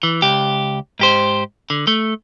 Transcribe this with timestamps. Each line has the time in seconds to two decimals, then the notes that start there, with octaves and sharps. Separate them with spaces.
0.03 E3
0.22 C#2 G4
0.99 G#2 G4 C5
1.70 D3
1.87 A3